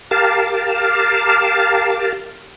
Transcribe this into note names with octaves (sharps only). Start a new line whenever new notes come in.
G4 A#4 F5 A5